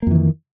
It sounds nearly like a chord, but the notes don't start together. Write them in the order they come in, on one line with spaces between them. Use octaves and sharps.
A#3 F2 E3 D#3